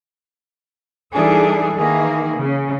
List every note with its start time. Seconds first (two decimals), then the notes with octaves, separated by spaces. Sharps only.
1.14 E3 G3 D4 D#4 G#4 A4
1.77 D#3 E3 A#3 G#4
2.38 C#3